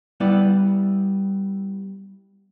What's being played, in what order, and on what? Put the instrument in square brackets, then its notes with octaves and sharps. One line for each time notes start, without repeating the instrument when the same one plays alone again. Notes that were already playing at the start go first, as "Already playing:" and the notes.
[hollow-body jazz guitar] G3 B3 E4 D5